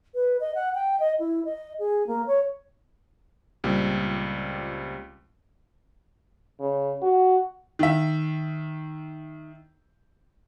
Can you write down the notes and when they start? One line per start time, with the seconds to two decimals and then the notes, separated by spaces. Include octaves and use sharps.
0.15 B4
0.40 D#5
0.54 F#5
0.74 G5
1.00 D#5
1.19 E4
1.45 D#5
1.79 G#4
2.07 A#3
2.27 C#5
3.64 C#2 A#2 G3 C4
6.60 C#3
7.02 F#4
7.79 D#3 E5